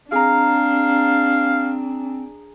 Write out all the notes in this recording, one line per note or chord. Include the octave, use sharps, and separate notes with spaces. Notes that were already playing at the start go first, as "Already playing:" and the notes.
C4 D4 G#4 F5 A#5